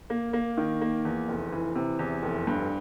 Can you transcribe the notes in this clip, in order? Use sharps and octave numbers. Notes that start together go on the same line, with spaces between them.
A#3
A#3
D#3
A#3
E2
F1
E3
C3
E2
F1
G2